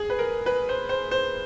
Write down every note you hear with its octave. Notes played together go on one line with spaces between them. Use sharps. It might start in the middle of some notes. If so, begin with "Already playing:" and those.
Already playing: G#4
B4
A#4
B4
C5
C5
C5